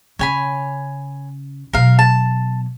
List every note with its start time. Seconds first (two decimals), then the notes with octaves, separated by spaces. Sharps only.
0.19 C#3 C#5 G#5 B5
1.73 B2 F#3 A#4 F5
1.99 A5